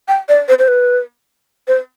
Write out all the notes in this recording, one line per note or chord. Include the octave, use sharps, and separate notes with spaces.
G5
D5
C5
C5
B4
C5